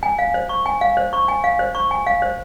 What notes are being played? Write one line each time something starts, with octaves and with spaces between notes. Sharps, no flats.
G#5
F5
C5
C#6
G#5
F5
C5
C#6
G#5
F5
C5
C#6
G#5
F5
C5